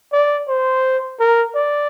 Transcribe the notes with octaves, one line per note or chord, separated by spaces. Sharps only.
D5
C5
A#4
D5